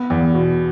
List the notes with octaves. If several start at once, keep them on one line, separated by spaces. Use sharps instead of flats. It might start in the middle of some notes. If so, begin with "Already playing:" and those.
Already playing: B3
E2
B2